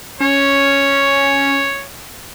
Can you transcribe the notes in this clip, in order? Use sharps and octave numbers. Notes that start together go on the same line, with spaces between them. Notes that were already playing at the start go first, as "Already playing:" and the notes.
C#4 C#5